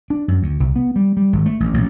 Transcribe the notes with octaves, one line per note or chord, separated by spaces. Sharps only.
D4
F#2
D2
C2
B3
G3
G3
G#1
A3
A1
A1